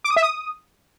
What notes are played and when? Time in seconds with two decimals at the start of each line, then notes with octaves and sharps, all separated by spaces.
0.04 D6
0.10 D#6
0.16 E5
0.22 D#6